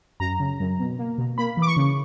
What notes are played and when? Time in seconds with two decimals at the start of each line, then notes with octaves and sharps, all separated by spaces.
0.20 F#2 A#5
0.40 C#3
0.60 F#2
0.79 B2
0.99 A#3
1.18 B2
1.38 A#3 B5
1.57 E3
1.62 D6
1.67 C#6
1.77 C#3